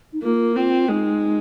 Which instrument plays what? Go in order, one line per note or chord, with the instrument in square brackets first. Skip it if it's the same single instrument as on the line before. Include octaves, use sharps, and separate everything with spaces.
[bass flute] D#4
[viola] A#3 [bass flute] F4
[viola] C4 [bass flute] F4
[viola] G#3 [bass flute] D#4